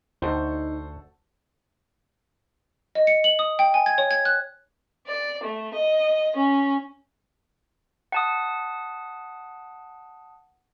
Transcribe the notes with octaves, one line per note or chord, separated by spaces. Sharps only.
D2 D#4 F#4 A4 C5 F#5
D#5
C#7
F#7
D#6
G5
G#5
G#6
C#5
G#6
F#6
D5
A3
D#5
C#4
F#5 A5 D#6